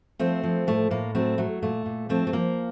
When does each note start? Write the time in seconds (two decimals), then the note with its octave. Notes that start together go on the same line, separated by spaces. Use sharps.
0.19 F3 A3 C4
0.43 F3
0.67 A2 A3
0.91 A2 A#3
1.15 F#3 A3 C4
1.38 F#3 A3
1.63 A#2 A3
1.86 A#2
2.09 F3 A3 C4
2.27 A3
2.33 F3 A#3